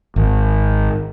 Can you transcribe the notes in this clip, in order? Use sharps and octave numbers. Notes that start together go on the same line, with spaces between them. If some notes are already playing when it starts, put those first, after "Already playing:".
G#1